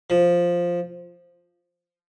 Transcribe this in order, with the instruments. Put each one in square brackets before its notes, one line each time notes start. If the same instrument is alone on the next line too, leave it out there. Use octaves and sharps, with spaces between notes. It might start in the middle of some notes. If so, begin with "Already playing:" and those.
[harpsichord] F3